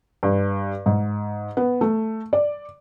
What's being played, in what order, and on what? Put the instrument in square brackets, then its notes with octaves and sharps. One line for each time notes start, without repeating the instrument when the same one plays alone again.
[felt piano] G2
G#2
B3
A3
D5